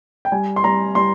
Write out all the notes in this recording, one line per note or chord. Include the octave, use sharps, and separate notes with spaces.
G5
G3 G#5
C6
G3 A#5
G3 C6